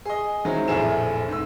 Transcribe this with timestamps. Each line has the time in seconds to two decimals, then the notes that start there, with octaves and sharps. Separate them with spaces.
0.05 G#4 D#5
0.45 D#3 F#3 G#3 C4 E4
0.68 F1 A#1 A2 E4 G#4 E7
1.28 G#2 E6